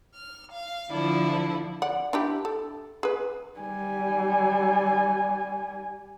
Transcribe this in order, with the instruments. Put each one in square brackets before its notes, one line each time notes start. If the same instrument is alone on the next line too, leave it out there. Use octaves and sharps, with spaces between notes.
[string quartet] F6
F5
D3 F3 E4 A4 D5
[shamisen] D5 F#5
D4 E4 G4
A4
G#4 B4
[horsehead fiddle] G3 G#5